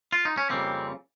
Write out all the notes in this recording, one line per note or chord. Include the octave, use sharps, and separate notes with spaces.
F4
D#4
C#4
F2 C#3 G3 A#3 C4